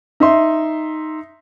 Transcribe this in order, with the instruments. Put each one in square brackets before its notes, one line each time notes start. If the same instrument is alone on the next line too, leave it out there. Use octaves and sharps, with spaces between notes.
[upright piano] D#4 E5 C6